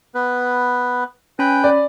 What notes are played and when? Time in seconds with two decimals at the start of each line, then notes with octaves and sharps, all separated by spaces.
0.15 B3 B4
1.39 C#4 B4 G5 G#5 B5
1.64 D5